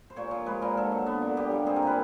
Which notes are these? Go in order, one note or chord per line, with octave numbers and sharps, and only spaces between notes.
C5
A#2 C#5
F3
G#3 B4
A#2 A#4
D3 A4
F#3
B3
D3
A#2 G4
G3
C4 G#4
A#4
A#2 B4